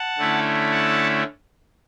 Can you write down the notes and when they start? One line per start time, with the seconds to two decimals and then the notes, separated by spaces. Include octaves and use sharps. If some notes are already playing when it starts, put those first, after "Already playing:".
Already playing: F#5 A5
0.18 D3 A3 C#4 E4
0.71 F#5 A5